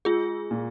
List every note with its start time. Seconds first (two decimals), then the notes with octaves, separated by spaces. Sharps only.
0.05 G#3 F4 G#4
0.51 A#2